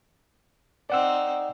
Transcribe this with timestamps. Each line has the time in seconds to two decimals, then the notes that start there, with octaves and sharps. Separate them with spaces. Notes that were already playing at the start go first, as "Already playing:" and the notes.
0.90 C4 D#4 D5 F#5 E6